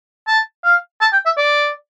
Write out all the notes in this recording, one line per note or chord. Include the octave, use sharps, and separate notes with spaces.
A5
F5
A5
G5
E5
D5